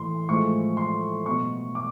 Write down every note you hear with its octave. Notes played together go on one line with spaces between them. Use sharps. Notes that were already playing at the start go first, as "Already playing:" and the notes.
Already playing: A2 E3 A3 C6
A2 F3 G#3 C#6
C6
B2 F#3 B3 C#6
D6